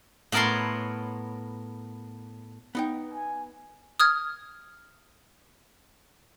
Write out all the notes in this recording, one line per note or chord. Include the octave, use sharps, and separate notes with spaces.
A2 B3 A#4 C#5 A5 C6
B3 D#4 G5
G#5
D#6 F6 G#6